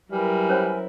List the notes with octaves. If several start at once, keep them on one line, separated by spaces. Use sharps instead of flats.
F#3 G3 E4 A#4 B4 G#5 F6
C#4 C5 C#5